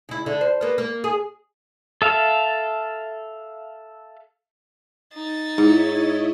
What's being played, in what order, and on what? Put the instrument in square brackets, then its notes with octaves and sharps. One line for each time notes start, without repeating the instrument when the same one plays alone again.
[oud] C#3 E4
D3
C5
A#3 B3
A#3
G#4
[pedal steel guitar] A4 E5 F5
[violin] D#4 A6
[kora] G#2 [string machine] E4 C#5 D#5